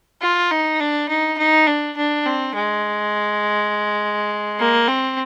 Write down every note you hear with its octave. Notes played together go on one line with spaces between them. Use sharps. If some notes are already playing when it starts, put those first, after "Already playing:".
F4
D#4
D4
D#4
D#4
D4
D4
C4
G#3
A#3
C4